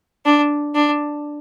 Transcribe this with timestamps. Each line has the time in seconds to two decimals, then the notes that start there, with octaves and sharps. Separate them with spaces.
0.25 D4
0.75 D4